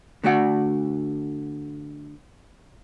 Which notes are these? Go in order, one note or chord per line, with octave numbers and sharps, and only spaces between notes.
D3 A3 F#4 D5 F#5